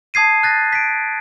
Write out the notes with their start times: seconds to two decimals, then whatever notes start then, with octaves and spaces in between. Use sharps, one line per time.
0.14 A5 D#6 G#6 C7 D#7
0.43 F#6 A6 A#6
0.72 B6 D7